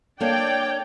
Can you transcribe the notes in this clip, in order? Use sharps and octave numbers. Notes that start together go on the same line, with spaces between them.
A#3 D4 A4 C#5 D5 G5